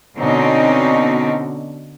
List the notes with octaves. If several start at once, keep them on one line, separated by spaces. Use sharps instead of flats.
B2 D3 C4 C#4 D#4